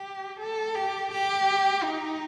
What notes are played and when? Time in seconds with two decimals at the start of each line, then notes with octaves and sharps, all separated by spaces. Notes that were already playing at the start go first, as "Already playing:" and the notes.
Already playing: G4
0.39 A4
0.75 G4
1.11 G4
1.83 D#4